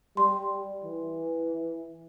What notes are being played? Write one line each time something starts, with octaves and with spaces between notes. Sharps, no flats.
G3 C6
E3